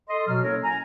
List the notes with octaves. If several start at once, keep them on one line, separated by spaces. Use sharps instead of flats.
A4 D#5 C6
B2 F#3 F6
A#3 C#4 E4 A4 A#4 C#5
G#5 A#5